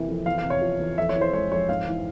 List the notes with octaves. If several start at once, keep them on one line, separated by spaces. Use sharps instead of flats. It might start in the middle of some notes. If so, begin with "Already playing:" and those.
Already playing: C3 E3 A#3
F2
E2 F5
F5
C3
C#5
F3
E2
F2 E5
C#5
E3
C5
G#3 C#5
F2 C#5
G#2 F5
E3